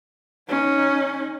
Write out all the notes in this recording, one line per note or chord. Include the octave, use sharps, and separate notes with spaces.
C#4 D#4